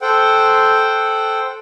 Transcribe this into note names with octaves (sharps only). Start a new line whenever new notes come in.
A4 C5 F#5 G5